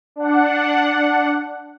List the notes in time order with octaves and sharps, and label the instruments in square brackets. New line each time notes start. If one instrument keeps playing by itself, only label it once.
[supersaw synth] D4 F#5